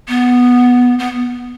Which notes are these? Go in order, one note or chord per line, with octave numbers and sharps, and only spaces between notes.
B3
B3